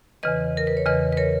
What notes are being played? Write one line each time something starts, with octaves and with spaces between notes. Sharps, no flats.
E2 C#3 E3 B4 D#5
A#4
B4
C#5
E2 C#3 E3 B4 D#5
B4
A#4 C#5